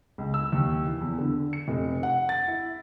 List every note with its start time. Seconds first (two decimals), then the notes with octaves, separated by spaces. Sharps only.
0.18 C#2
0.34 E6
0.52 D#2
0.87 E3
1.01 E2
1.18 D3
1.53 C#7
1.68 F1
2.03 F#5
2.29 A6
2.48 E4